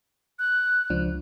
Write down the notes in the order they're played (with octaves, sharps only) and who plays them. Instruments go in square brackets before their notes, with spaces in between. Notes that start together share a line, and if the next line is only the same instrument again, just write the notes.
[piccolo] F#6
[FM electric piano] C#2 F3 D4